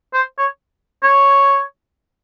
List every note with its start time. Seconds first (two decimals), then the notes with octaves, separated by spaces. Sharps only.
0.14 C5
0.38 C#5
1.03 C#5